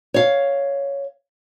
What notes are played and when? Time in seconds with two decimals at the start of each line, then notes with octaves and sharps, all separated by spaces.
0.14 C#5 F5